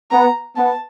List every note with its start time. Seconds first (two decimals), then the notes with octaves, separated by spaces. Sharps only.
0.11 B3 A#5
0.56 B3 A5